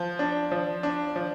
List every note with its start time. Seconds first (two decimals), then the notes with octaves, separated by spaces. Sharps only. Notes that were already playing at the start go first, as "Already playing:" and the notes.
Already playing: F3
0.19 D4
0.52 F3
0.83 D4
1.16 F3